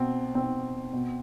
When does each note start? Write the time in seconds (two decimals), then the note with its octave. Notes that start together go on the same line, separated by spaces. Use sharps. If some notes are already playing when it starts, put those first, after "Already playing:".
Already playing: B2 C4
0.34 B2 C4
0.93 B2